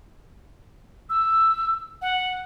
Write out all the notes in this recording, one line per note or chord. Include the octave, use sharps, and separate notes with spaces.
E6
F#5